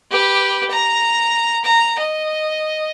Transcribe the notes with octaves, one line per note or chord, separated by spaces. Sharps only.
G4 B4
A#5
A#5
D#5